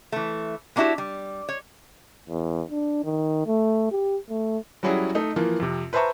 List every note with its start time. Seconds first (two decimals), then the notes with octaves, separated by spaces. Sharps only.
0.12 E3 A3
0.76 G#3 A#3 D4 E4 F#4 G4
0.98 G3
1.49 C#5
2.29 E2
2.71 D4
3.04 D#3
3.46 A3
3.91 G4
4.29 A3
4.83 F#3 G3 C#4 E4 F#4 G#4
5.15 A3 D#4
5.36 E3 F3 A#3
5.60 F2 C3
5.93 B4 C5 E5 A5 A#5 C#6